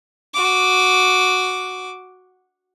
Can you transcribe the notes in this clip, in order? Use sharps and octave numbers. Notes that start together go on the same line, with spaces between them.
F#4 D6